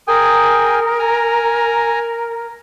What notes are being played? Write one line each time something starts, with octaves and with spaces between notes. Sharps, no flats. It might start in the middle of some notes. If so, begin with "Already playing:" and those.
G#4 A#4 G5 G#5
G#5 A#5